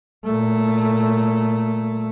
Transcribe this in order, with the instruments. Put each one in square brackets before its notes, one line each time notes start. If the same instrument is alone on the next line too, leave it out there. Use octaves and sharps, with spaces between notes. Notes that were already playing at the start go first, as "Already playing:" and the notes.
[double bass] A#2 A3